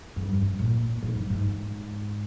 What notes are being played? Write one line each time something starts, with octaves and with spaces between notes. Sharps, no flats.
G2
F2
G2
A#2
G#2
G2
G#2